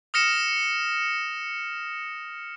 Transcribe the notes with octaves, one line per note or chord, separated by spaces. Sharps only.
D#6 F6 A#6 C#7 E7